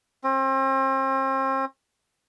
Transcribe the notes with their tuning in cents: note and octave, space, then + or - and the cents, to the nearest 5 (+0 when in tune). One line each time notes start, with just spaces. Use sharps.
C4 +40